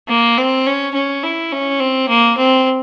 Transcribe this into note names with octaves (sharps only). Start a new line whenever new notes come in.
A#3
C4
C#4
C#4
E4
C#4
C4
A#3
C4